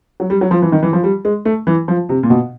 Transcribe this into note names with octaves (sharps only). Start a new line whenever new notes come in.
F#3
G3
F#3
F3
E3
D#3
E3
F3
G3
G#3
A3
E3
F3
C3
A#2
B2